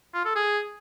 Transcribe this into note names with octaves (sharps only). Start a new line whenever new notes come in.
F4
A4
G#4